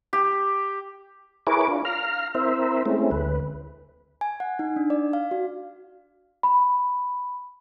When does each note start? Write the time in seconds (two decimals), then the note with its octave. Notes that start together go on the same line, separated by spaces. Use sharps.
0.13 G4
1.47 E4 G#4 A#4 B4 C#5 D6
1.68 D4 F4
1.85 F5 A#5 F6
2.35 C4 E4 A#4 C5 E5
2.86 G#3 A3 C4 C#4 E4
3.11 D2 B4
4.21 G#5
4.40 F#5
4.59 D#4
4.76 D4
4.90 D5
5.13 F5
5.31 F#4
6.43 B5